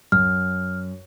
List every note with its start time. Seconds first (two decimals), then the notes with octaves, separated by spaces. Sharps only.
0.12 F#2 F6